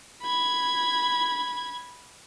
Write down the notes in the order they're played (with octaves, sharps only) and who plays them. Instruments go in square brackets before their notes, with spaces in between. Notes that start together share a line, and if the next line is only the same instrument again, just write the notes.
[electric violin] B5 G#6